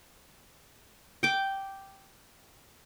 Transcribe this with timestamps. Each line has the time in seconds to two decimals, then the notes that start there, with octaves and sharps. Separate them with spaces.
1.23 G5 D6